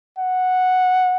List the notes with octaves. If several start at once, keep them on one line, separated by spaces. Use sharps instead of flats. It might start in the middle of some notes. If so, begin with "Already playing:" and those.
F#5